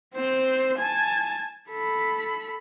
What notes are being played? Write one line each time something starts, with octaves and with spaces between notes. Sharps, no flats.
C4 C5
G#5 A5
A4 B5